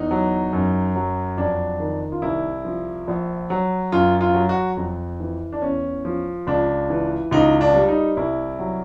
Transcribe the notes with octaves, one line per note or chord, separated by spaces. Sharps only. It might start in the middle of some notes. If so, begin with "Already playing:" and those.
Already playing: E2 D#4
F#3
F#2
F#3
F2 D4
D#3
F4
C2 E4
F3
A#1
F#3
F#2 F4
F4
F#3
F#4
F2
E3
D4
E2 C#4
F3
C#2 D4
E3
C#2 D#4
D4
G3
D#4
C2 E4
F#3